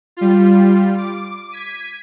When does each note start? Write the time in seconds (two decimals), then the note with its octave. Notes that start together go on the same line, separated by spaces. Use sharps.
0.17 G3 F4
0.98 D6
1.52 G#6 B6 D#7